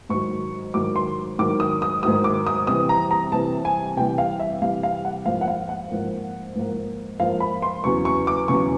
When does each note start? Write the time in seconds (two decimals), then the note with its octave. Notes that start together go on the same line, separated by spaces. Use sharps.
0.09 G#2 D#3 F#3 C#6
0.74 G#2 D#3 F#3 D6
0.96 C6
1.39 G#2 D#3 F#3 D6
1.60 D#6
1.82 D#6
2.03 G#2 D#3 F#3 D#6
2.24 D6
2.47 D#6
2.67 C3 E3 G3 D#6
2.89 A#5
3.11 A#5
3.32 C3 E3 G3 A5
3.65 G#5
3.97 C3 E3 G3 G5
4.18 F5
4.39 E5
4.61 C3 E3 G3 F5
4.83 F5
5.05 F#5
5.26 G#2 F3 A#3 F5
5.41 F#5
5.48 F5
5.69 F#5
5.91 G#2 F3 A#3
6.55 G#2 F3 A#3
7.20 G#2 F3 A#3 F5
7.40 B5
7.62 C6
7.84 E2 C#3 F#3 C#6
8.05 C#6
8.27 D6
8.48 E2 C#3 F#3 C#6